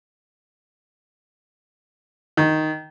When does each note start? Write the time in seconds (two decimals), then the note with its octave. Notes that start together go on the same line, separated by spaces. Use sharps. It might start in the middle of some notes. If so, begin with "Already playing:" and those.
2.37 D#3